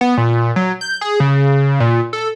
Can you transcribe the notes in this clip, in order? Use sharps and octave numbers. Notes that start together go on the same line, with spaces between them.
B3
A#2
F#3
G6
G#4
C#3
A#2
A4